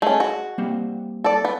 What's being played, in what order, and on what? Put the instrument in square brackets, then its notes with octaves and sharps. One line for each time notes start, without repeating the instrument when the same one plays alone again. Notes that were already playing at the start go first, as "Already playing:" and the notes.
[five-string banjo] A3 C#4 [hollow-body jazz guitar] G#4 C#5 D#5
[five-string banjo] F#4
[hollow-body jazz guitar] G3 A#3 C4
[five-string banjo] A4 D5
B3